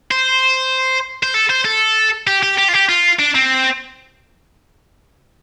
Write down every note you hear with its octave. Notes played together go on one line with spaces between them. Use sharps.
C5
C5
A4
C5
A4
G4
G4
G4
F4
G4
F4
D4
C4